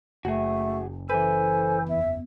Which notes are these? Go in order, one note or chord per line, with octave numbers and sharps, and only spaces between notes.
F#1 A3 F#4 G#4
E3 A4 B4 C5 G#5
E2 E5